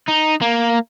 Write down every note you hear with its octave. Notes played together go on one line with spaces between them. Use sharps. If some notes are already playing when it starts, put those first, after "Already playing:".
D#4
A#3